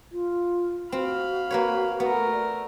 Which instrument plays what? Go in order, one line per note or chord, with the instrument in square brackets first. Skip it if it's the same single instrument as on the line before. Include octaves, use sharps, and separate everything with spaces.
[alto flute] F4
[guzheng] C4 [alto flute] F#4 [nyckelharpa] F5 B5
[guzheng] A#3 B4 C#5
[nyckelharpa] A3 A#4 [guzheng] B3
[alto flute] D5